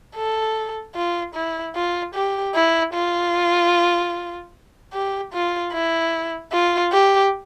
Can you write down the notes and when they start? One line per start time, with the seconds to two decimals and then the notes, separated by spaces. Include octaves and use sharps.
0.16 A4
0.95 F4
1.34 E4
1.75 F4
2.14 G4
2.55 E4
2.94 F4
4.93 G4
5.33 F4
5.73 E4
6.52 F4
6.92 G4